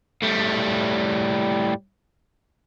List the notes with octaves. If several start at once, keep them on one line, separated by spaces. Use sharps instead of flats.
A2 G3